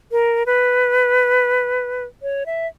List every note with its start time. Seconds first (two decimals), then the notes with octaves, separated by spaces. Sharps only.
0.12 A#4
0.46 B4
2.22 C#5
2.46 E5